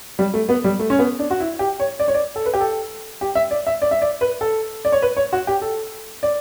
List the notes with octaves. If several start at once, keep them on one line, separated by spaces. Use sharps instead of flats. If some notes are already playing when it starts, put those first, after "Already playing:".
G3
A3
B3
G3
A3
C#4
B3
D4
F#4
E4
G4
C#5
D5
C#5
D5
A4
B4
G4
A4
G4
E5
D5
E5
D5
E5
D5
B4
A4
D5
C#5
B4
C#5
F#4
G4
A4
D5